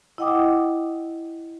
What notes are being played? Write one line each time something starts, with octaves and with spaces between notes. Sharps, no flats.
E4 D#5 F#5 G5 D6 D#6